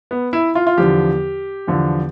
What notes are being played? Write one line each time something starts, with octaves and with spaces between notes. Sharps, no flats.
B3
E4
F4
F4
E2 D3 F3 G4
E2 D3 F3